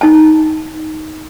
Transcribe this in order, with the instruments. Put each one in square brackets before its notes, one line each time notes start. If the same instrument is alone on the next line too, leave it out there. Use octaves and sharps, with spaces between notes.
[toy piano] D#4 A5